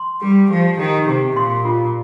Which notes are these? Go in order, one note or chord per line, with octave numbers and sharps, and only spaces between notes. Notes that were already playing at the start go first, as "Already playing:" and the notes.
Already playing: C6
G3 G4
F3 G4
D#3 G4
C3 G4
A#2 C6
F4